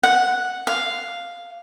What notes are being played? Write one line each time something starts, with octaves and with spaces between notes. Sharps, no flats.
F#5
F5